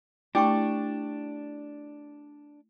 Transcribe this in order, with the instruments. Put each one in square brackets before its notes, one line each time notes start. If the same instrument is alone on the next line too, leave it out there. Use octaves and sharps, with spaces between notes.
[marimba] A3 [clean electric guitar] D4 [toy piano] E4 G5 C#6 [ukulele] G4